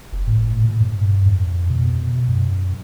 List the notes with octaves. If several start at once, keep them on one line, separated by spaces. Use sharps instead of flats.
F#1
A2
A#2
G2
F2
B2
F#2